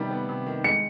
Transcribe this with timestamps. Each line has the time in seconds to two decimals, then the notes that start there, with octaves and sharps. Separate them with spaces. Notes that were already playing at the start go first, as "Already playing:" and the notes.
Already playing: C3 D#3 G3 B3
0.11 B3
0.29 C3
0.46 D#3
0.64 G#3 C#7